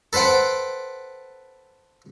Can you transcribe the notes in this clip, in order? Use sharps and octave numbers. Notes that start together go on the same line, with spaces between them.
A4 B4 C5 F#5 G5